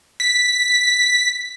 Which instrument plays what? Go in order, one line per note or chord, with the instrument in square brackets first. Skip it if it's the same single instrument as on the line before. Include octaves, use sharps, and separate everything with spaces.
[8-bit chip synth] B6